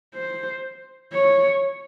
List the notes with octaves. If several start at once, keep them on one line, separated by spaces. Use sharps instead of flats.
C5
C#5